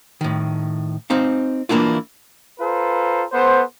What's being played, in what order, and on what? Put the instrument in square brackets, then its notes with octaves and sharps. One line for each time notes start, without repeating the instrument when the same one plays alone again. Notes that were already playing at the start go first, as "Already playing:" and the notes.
[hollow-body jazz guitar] A2 D#3
C4 D#4 F5
E3 A#3 D4 E4 F4
[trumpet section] F4 A4 B4 C5 A#5
B3 A4 C5